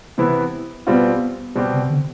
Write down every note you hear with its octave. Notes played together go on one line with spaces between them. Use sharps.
C3 E3 B3 E4
B2 G3 B3 C4 F4
B2 G3 C4 G4
C3
D3